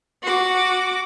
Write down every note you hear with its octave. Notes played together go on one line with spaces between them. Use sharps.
F#4 D6